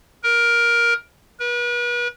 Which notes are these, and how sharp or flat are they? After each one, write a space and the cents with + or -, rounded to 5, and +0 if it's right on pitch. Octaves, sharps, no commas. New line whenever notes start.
A#4 +15
B4 -40